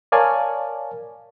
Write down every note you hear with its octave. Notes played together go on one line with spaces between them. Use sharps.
A#4 C#5 D5 F5 G#5 A5